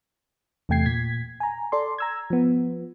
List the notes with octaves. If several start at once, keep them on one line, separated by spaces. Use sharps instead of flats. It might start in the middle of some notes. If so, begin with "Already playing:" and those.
E2 C3 A3 G5 G#6 C7
A#2 G#6 B6
G#5 A#5
A4 D5 C6
A#5 E6 G#6
F3 B3